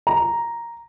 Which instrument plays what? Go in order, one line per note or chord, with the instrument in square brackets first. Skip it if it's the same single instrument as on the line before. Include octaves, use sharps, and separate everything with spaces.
[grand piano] A#5